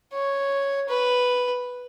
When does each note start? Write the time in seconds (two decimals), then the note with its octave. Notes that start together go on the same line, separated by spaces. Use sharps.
0.13 C#5
0.89 B4